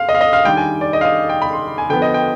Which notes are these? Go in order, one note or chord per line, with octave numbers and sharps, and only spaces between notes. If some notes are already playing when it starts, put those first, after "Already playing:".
Already playing: F5
D#5
F5
D#5
F5
D#3 G3 D4 G5
G#5
D5
D#5
F5
D#5
G5
B5
C6
G#5
D3 F3 B3 G5
D#5
G5